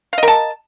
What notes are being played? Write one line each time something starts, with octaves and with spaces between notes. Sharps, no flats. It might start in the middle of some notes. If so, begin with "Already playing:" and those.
A#4 D#5 F5 A5